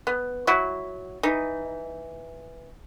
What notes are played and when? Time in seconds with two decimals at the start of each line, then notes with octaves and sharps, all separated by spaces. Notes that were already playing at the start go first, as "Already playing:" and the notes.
0.07 B3
0.47 F#3 E4 F#4
1.23 E3 D#4